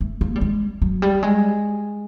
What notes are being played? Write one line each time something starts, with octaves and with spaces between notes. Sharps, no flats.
A3
A#3
G3
G#3
F#3
G3
G#3